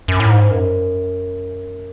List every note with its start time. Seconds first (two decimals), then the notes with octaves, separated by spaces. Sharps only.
0.08 F#2
0.20 A2
0.30 G#2
0.51 F#2